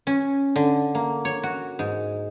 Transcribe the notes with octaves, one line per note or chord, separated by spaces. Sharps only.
C#4
D3
A#3
C#5
F#4
G#2